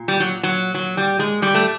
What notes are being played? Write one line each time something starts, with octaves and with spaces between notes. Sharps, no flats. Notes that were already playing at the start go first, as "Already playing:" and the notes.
Already playing: A#2
G3
F#3
F#3
F#3
G3
G#3
G3
A3